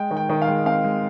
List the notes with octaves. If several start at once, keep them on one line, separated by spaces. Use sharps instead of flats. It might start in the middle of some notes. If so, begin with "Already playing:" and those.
Already playing: G#3 G5
D#3
G5
D#3
F5
G#3
C4 F5
G#3